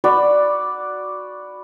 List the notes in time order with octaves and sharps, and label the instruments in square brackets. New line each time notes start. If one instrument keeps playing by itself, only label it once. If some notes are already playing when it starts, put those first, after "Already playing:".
[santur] F#4 D5 B5